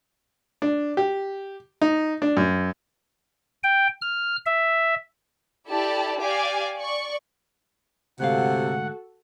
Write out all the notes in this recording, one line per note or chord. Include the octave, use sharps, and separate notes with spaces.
D4
G4
D#4
D4
F#2
G5
F6
E5
E4 G4 A4 D5 A5
G4 D5 F5 G#5 D6
D5 C#6
D2 G#2 C3 F#4 A4 F5 F#5